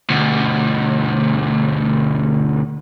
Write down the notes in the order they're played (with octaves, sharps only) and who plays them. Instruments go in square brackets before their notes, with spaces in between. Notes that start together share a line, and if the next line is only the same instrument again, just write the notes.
[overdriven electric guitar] D2 B2